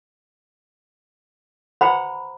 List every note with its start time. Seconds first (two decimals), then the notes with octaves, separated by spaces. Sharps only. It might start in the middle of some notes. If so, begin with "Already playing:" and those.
1.81 C5 F#5 A#5 B5